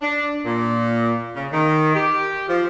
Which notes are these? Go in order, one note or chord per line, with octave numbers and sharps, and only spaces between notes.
D4
A#2
C#3
D#3
G4
F3